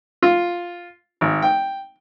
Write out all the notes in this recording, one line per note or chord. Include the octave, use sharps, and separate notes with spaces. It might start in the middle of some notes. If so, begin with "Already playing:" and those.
F4
G#1
G5